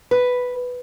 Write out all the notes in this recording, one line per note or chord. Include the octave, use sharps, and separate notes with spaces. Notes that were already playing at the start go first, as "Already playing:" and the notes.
B4